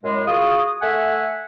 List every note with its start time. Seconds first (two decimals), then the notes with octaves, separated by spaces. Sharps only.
0.04 F#2 A2 G#3
0.28 F4 F#4 G#4 D#6
0.82 A3 E5 F#5 G#5